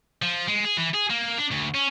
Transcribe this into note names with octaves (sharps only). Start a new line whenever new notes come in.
F3
G#3
G#4
E3
G#4
A#3
D4
D2
C#4